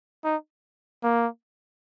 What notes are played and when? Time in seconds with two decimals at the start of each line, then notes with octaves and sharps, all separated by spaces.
0.24 D#4
1.03 A#3